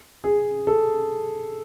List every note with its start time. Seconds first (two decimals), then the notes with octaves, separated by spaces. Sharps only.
0.24 G#4
0.67 A4